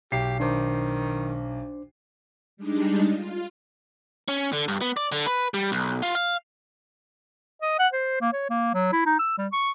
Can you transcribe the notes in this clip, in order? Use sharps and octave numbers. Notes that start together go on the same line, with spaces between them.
B1 G4 C7
D#3 D4 C5 D6
G3 G#3 D4 D#4
F4
C#4
D3
G2
B3
D5
D3
B4
G3
B1
F4
F5
D#5
F#5
C5
A#3
C#5
A#3
F#3
E4
D#4
E6
G3
C#6